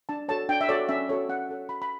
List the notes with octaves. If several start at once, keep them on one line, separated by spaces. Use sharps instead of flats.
D4 A5
F#4 A4 C#5 A5
D4 G5
E5
F#4 A4 C#5 D5
C#4 E5
F#4 A4 C#5
C#4 F#5
F#4 A4 C#5
F#4 B5
B5